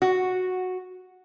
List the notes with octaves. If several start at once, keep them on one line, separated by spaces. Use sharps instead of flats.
F#4